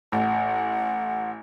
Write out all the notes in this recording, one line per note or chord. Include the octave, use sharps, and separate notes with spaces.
A1 F#5